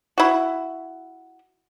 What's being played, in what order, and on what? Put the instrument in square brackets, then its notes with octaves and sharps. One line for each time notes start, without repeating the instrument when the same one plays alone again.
[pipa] E4 F#4